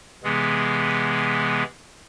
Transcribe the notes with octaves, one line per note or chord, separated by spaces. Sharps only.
C3 E3 G#3 B3 G#4